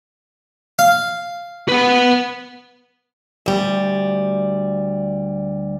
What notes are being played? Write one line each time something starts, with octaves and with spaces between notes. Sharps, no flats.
F5
B4 F#5
D2 G3